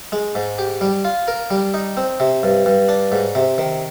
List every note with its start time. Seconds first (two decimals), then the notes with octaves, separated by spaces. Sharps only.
0.12 G#3
0.35 G#2
0.58 G4
0.81 G3
1.05 F4
1.28 A#4
1.51 G3
1.74 D#4
1.97 C4
2.20 C3
2.43 G2
2.66 G2
2.89 D4
3.12 G#2
3.35 C3
3.58 D#3